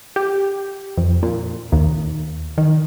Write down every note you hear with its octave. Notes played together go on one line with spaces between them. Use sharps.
G4
F2
A#2
D#2
D#3